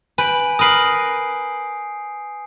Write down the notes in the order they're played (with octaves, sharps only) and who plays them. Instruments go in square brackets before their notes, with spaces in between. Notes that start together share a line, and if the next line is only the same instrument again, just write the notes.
[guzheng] B4 [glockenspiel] G#5 G6 D7
[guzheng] A#4 B4 [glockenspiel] D#6 C7